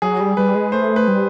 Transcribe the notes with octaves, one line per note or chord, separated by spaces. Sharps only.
F#3 G#4
G3
G3 B4
G#3
A3 C5
B4
G3